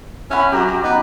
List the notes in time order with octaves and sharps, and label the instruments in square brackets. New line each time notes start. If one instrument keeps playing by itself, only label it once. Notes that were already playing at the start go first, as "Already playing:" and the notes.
[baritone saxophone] C#4 [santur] E5 F#5 B5
[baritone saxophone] F#2 [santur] G4 A#5 D6
[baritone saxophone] F#2
[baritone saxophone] B3 [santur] D#4